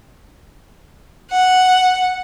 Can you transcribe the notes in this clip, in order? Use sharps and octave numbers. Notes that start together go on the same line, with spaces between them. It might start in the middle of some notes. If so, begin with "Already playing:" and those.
F#5